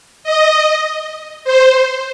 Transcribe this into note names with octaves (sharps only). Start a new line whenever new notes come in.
D#5
C5